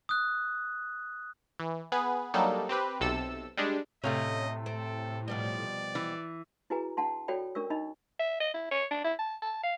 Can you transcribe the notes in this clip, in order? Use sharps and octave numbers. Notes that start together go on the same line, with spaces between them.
D#6 F#6
E3
B3 G#4 B4
F#3 G3 A#3 D4 D#4 A4
C4 G4 B4
B1 C3 A4 E6
G3 G#3 D4
A2 C3 A3 C#4 D#5 F5
C4 A4
B2 F3 G3 D5
E3
E4 F#4 G#4 B4 G#5 A#5
D4 F#5 A5 C6
F#4 A4 C#5 D5 G5 B5
C#4 D4 A#4 C#6 E6
D4 D#4 D#5 B5
E5
D#5
E4
C#5
D4
E4
A5
A5
F5